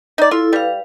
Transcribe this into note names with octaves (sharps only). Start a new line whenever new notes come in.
D#4 D5
E4 F4 A4
G3 B4 F5